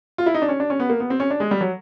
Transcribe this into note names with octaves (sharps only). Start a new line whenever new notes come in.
F4
E4
D#4
D4
C#4
D4
C#4
B3
A#3
B3
C4
C#4
D4
G#3
G3
F#3